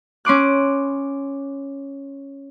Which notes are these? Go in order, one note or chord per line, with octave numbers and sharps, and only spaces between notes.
C#4 C6 D6 F#6